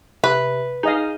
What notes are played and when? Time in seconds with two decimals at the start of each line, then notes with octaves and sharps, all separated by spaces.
0.24 C3 B4
0.83 D#4 G#4 D#5 F5